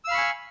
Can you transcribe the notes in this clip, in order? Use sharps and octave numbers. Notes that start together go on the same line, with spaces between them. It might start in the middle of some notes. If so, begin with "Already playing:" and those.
F5 G#5 B5 C#6 E6